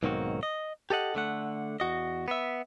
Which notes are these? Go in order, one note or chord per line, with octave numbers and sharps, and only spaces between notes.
B1 G#2 D#3 A#3 C4 F#4
D#5
G4 A4 D#5 F#5
D3 A3 F#5
E2 F#4 D#5
B3 E5